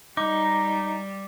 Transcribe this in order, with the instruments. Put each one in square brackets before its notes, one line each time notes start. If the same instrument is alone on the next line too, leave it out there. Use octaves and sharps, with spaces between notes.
[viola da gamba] G3 [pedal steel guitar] D#4 [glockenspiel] D6